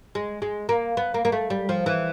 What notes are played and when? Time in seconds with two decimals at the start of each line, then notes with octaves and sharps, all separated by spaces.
0.15 G#3
0.42 G#3
0.69 A#3
0.97 B3
1.14 A#3
1.25 A#3
1.32 A3
1.50 G3
1.69 F3
1.86 E3